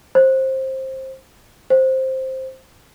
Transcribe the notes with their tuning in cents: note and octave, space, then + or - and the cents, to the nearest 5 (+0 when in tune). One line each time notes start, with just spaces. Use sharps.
C5 +15
C5 +5